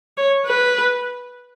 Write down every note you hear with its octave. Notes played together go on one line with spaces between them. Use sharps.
C#5
B4